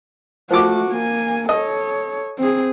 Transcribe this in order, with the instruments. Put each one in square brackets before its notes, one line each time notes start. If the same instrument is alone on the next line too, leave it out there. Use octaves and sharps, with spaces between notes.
[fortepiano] F3 D6 [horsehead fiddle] A3 F#4
[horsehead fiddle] A#3 G#5
[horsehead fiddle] A4 C#5 [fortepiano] D#5
[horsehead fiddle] C4 G#4